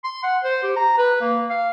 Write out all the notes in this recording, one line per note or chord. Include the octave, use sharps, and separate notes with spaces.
C6
F#5
C5
G4
A#5
B4
A#3
F5